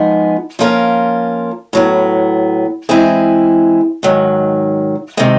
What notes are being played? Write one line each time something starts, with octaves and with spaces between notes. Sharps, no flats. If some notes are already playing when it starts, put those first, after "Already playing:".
Already playing: F3 G#3 B3 D#4 G#4
F3 A#3 C#4 F4 A#4
A2 F#3 B3
E3 G#3 C4 E4 G#4
G#2 D#3 F#3
C3 D#3 G#3 C4